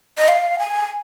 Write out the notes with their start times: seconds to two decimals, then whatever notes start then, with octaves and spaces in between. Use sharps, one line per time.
0.18 D#5
0.28 F5
0.59 G#5